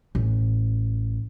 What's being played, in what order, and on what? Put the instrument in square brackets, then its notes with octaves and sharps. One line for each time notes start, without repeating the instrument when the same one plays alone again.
[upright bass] A1